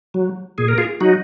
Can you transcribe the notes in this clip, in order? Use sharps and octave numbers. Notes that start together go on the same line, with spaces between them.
F#3
A#2 G#4
A#4
F4 G#4
F#3 D#4 F#4